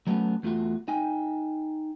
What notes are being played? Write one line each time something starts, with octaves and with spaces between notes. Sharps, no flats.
F#3 G3 A3 B3 C#4 F#4
E2 A3 F4 F#4
D#4 G5 G#5